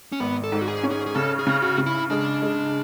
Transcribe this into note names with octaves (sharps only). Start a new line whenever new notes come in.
C#4
G#1 B3
A4
G#2
F#4
G#4
C#4
G#4
G#4
C#3 A4
G#4
C#3
F#4
C#3
E4
G#3 D4
G#3